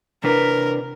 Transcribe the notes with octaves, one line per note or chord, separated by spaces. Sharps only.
C3 D4 A#4 B4